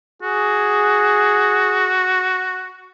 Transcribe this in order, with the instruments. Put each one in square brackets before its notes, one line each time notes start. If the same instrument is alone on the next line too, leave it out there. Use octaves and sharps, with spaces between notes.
[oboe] F#4 [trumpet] G#4